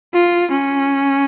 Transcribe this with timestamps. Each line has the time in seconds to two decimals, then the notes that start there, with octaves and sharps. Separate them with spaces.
0.13 F4
0.51 C#4